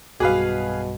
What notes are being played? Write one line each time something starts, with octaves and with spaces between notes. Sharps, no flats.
B1 G2 B2 F#4 G#4 B4 F5